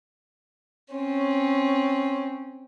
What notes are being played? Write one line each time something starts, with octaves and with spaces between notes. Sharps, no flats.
C4 C#4